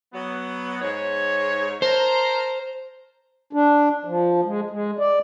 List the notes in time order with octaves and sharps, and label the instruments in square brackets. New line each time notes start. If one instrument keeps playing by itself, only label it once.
[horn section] F#3 B3
G#2 C#5
[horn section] A#4 A5 A#5 [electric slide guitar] C5
[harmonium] D4
F3
G#3
G#3
D5